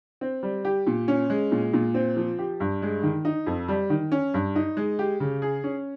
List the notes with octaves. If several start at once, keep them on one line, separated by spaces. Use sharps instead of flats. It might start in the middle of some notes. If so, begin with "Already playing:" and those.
C4
G3
G4
A#2
C#4
G#3
A#2
A#2
C4
F3
G4
G2
G#3
D#3
D#4
F2
G3
D#3
C#4
G2
D#4
G#3
G4
C#3
G#4
C#4